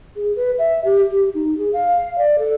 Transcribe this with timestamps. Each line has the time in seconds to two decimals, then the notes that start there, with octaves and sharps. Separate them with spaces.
0.16 G#4
0.36 B4
0.58 E5
0.85 G4
1.11 G4
1.34 D#4
1.58 G#4
1.73 F5
2.18 D5
2.39 A4